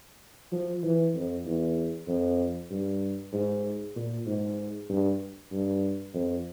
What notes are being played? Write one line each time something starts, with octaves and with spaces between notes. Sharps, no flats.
F3
E3
F2
E2
F2
G2
G#2
A#2
G#2
G2
G2
F2